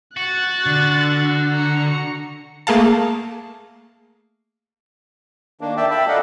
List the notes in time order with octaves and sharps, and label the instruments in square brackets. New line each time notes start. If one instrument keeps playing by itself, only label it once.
[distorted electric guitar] F#4 [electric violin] F#6 A6
[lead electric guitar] D3
[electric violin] A#5 C#7
[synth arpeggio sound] A3 A#3 G#4 F5 A5
[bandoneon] D#3 A#3 D4
D5 E5 G5 A5
E5 G5 A5 B5
A4 A#4 D5 D#5 F5 F#5